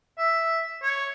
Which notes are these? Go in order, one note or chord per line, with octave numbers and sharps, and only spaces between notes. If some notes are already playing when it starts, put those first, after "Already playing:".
E5
C#5